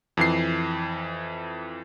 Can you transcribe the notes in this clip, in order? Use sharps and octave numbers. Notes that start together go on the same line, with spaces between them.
F2 E3 C7